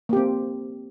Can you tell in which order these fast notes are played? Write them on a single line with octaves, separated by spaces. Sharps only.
A#3 G4 C4